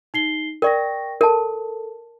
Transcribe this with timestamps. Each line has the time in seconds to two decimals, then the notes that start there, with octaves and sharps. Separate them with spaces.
0.14 D#4 C7 G7
0.62 A#4 D5 G5 C#6 A#6
1.21 A4 A#4 A5